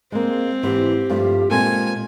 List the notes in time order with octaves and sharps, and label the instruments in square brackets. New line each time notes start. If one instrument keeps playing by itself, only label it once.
[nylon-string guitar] G#3 A#3 [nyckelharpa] C4
[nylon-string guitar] G#2 E3 [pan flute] G4
[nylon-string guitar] G2 F3 A3
[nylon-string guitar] A#2 C4 A4 [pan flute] G#3 [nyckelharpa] G#5